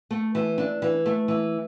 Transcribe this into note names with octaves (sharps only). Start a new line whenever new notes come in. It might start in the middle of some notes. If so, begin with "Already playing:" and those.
A3
E3
D4
E3
A3
E3